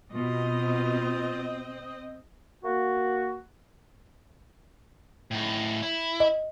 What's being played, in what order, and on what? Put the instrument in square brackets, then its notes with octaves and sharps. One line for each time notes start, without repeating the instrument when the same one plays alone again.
[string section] B2 [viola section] C4 D#5 [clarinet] F4
[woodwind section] A#3 F#4
[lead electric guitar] A2 D#4
E4
[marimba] D#5